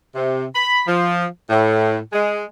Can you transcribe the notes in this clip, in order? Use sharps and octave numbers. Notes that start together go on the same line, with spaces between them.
C3
B5
F3
A2
G#3